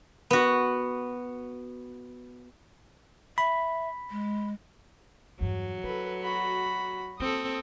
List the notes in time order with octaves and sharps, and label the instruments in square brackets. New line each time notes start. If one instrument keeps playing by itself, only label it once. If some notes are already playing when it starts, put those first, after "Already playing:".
[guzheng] B3 F#4
[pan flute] E5 [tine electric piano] B5
[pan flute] G#3
[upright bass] E2 G2 [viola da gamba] F#3
[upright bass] E4 [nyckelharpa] A4 B4
[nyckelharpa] F#4 B5
[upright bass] A#3 [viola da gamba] C4 A4 [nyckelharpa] D#6